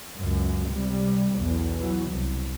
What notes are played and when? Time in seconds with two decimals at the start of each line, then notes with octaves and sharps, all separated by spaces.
0.17 C#2 F#2
0.72 C3 G3
1.37 B1 E2
1.78 E3 F#3
2.10 C2